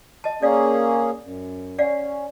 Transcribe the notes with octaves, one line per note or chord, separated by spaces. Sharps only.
D#5 A5
A#3 C#4 G#4 D5 F5
F#2
C#4 D5 F5 F#5